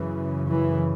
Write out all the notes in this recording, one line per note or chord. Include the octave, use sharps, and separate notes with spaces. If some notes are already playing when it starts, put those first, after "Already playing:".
Already playing: F#2 C#3 E3
E3